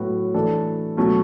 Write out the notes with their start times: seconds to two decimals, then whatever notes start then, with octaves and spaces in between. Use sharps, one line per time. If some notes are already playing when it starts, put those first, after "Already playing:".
Already playing: A2 F#3 B3 F#4
0.34 E3 A3 D4 A4
0.97 B2 F#3 A3 C#4